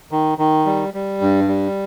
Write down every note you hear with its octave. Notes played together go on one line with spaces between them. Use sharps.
D#3
D#3
G3
G3
G2
G3